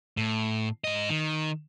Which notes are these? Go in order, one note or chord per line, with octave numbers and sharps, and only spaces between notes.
A2
G#2 D#5
D#3